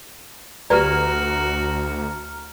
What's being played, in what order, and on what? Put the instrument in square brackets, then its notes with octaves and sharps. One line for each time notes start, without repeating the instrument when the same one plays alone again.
[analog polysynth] D2 [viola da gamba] F#4 [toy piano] G4 B4 D5 [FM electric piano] A#5 F6